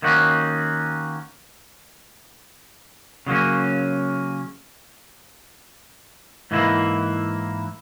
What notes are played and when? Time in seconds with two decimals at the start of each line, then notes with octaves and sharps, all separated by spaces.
0.02 D#3 A#3 C#4 F#4
3.26 C#3 F#3 A#3 C#4
6.51 G#2 E3 A#3 E4